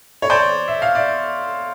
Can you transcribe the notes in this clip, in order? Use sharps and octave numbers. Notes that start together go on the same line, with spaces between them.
C#5
C5 D5
E5
F5
D5 E5